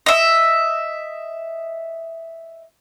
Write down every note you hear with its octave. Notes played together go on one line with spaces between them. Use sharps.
D#5 E5